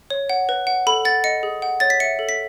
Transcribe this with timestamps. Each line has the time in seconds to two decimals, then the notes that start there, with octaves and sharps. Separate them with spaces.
0.10 C#5
0.30 F#5
0.49 B4
0.67 F#5
0.87 A4 B5
1.05 F#5 A6
1.24 D#5 C#7
1.43 G#4
1.62 F#5
1.80 C#5 A6
1.90 B6
2.00 E5 C#7
2.19 A4
2.29 B6